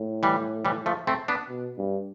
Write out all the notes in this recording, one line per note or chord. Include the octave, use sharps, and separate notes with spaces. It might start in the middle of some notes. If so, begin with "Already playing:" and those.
Already playing: A2
E3 G3
E3 G3
F3 A3
A3 C4
B3 D4
B2
G2